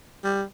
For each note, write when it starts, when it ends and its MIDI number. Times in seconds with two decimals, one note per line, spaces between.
0.24 0.43 55